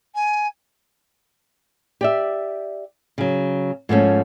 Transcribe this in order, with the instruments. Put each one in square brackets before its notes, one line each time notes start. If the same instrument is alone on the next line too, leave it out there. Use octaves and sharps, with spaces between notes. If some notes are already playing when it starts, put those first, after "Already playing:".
[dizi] G#5
[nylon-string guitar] G4 D5 E5
C#3 F#3
G#2 F3 A3 C#4